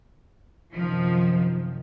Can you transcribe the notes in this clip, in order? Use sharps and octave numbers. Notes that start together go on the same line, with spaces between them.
F#2 C3 D#3 F3